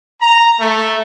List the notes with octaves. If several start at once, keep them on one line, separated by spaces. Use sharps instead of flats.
A#5
A3